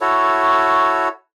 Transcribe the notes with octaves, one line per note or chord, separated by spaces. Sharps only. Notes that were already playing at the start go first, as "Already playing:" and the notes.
E4 F#4 A4 C#5